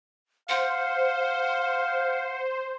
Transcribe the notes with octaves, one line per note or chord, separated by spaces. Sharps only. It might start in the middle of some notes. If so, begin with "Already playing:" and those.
C5 F5 F#5